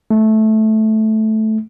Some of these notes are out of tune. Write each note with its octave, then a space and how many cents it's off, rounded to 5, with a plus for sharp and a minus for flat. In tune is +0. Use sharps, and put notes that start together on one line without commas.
A3 -10